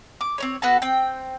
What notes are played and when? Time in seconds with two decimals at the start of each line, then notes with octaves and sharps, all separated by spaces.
0.21 D6
0.38 C4 C#4 C#5
0.62 B3 F#4 A4 A5
0.82 C4 G5